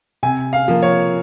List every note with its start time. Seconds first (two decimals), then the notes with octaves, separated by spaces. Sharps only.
0.23 C3 G#5
0.53 F5
0.68 F3 A#3
0.83 C#5